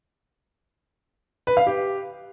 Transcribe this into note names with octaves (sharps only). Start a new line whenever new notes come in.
B4
F5
G4